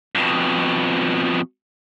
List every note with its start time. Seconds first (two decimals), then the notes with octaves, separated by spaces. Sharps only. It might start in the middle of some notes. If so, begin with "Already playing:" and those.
0.15 F2 B2